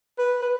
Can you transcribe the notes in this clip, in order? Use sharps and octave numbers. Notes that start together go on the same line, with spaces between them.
B4
B4